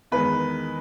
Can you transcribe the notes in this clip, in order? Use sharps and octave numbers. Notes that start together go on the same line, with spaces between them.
E2 D#3 G#3 B4